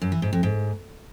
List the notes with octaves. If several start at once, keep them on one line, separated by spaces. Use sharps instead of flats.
F#2
E3
G#2
F2
G#2